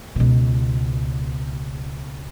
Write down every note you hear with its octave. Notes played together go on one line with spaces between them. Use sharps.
C#2 B2